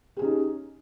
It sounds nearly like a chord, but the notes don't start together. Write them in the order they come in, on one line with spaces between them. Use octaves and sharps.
G4 G#4 C#4 D#4